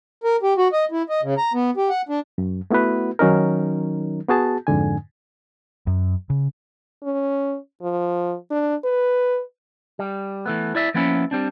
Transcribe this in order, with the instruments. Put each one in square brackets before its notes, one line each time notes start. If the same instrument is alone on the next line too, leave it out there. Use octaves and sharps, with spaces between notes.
[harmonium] A#4
G4
F#4
D#5
E4
D#5
C#3
A#5
B3
G4
F#5
D4
[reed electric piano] F#2
A3 B3 E4 F#4 B4
D#3 F#3 C#4 D#4 A#4
B3 F#4 G#4 A5
F2 G#2 D3 G#5
[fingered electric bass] F#2
C#3
[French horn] C#4
F3
D4
B4
[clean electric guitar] G3
E3 A3 B3
E4 D5 E5
F3 A#3 B3 C#4 E4
G3 C4 D4